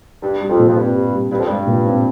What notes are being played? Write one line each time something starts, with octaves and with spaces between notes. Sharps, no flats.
G2 G4
G3
F2
A#2
F2
G2 C4
G4
G3
G2 G4
F2
G2 G#3
A#2
C4